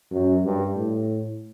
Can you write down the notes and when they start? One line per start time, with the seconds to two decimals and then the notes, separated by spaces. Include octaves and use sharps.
0.11 F#2
0.44 G2
0.76 A2